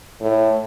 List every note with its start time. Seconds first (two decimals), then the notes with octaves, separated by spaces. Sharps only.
0.21 A2